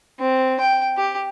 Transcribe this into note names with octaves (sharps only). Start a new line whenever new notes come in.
C4
G5
G4